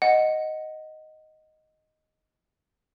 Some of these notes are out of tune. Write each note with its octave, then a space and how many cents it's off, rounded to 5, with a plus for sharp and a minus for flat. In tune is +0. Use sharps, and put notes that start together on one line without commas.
D#5 +0 F#5 +0